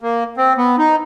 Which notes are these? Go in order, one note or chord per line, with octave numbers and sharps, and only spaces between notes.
A#3
C4
B3
D#4